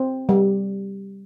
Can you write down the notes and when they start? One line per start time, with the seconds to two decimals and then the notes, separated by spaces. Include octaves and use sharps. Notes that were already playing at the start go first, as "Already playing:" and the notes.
Already playing: C4
0.29 G3